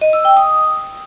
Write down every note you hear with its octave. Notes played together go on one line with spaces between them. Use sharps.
D#5
E6
G5
D#6